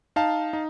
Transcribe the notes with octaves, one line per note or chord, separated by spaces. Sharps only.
D#4 F5 A5
D#4